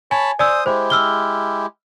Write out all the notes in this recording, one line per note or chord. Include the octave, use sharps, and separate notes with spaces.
C#5 G#5 A5 B5
C5 D5 G#5 D#6 E6
G#3 E4 G4 C5
E6 F6 G7